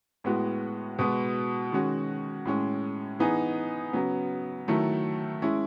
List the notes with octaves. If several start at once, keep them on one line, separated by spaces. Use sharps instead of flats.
A2 G#3 B3 F#4
B2 G#3 B3
D#3 G#3 C#4 F#4
A2 G#3 C#4
E3 B3 D#4 G#4
C#3 F#3 B3
D#3 F#3 A3 E4
G#3 C#4 E4